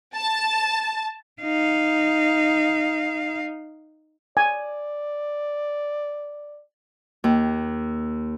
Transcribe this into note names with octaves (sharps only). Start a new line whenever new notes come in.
A5
D#4 F5
D5 G#5
D#2